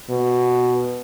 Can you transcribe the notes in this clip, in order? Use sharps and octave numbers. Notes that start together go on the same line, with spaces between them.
B2